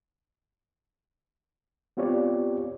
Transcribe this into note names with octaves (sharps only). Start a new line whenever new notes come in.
B3 C4 F4 G4 C#5 D5